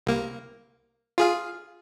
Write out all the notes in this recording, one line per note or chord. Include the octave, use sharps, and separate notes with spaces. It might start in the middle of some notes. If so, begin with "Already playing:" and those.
C2 A#3
F4 G#4 F5